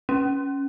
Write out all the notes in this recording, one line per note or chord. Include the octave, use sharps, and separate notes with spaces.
C#4